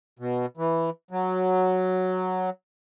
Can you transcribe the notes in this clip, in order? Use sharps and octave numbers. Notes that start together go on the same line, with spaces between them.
B2
E3
F#3